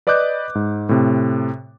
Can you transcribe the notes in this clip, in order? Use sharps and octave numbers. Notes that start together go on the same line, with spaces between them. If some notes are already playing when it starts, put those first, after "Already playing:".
B4 D5 D#5 D6 F#6 G6
G#2
A2 C3